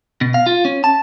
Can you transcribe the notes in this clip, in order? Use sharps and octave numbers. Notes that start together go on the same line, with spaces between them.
B2
F5
F4
C#4
A5